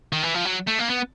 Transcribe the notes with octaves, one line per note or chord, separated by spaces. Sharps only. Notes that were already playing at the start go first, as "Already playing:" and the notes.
D#3
E3
F3
F#3
A3
A#3
B3